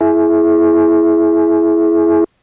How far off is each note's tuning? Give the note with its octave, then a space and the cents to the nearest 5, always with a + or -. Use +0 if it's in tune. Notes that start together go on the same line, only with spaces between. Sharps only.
E4 +5 G#4 +25